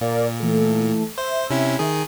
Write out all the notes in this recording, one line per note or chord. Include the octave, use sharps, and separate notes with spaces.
A#2 A#4 D5 F5
E3 A3 A4
C5 E5
C3 C#4 E4
D#3 G#4